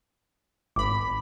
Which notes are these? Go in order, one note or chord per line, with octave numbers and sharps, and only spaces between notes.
G#1 B5 D6